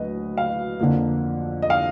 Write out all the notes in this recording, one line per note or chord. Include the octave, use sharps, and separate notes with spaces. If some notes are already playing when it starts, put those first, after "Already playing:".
Already playing: D2 F#3 B4 D#5
F5
F2 D3 F3 A#3
D#5
F5